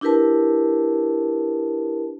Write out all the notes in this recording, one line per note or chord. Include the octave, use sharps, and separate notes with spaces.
D4 E4 G4 A#4 B4 A5